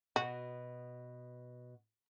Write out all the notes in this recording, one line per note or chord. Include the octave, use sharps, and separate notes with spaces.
B2 B3 F#4